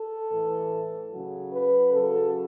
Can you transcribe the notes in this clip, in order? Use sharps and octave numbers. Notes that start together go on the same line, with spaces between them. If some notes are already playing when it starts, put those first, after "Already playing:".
Already playing: A4
A2 E3
C#3 F#3
B4
C#3 F#3 A4